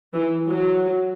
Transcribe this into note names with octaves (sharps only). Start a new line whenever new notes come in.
E3
F#3